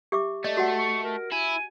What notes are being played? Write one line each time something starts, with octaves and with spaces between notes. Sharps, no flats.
G4 E5 D6
A3 D5 D#5
F#4 F#5
C#6
A#4
E4 G#5